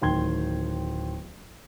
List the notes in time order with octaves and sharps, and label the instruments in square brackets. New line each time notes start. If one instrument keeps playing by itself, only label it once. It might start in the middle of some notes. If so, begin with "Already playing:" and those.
[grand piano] D1 D#3 G5 C6 G#6 G7